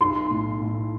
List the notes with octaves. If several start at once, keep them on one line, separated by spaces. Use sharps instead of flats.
B1 C6
A2
A2